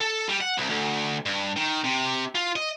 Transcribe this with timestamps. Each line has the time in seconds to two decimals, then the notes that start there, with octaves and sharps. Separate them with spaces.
0.01 A4
0.29 G3
0.41 F#5
0.58 C2
0.70 D2
1.26 G2
1.56 D#3
1.84 C3
2.35 F4
2.56 D#5